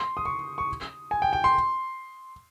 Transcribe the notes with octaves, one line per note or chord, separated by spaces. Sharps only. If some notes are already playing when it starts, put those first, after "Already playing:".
Already playing: C6
D#6
C#6
C#6
G#5
G5
G5
C6